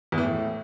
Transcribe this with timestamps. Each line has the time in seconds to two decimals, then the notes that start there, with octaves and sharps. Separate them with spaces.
0.12 E2
0.18 E3
0.23 A2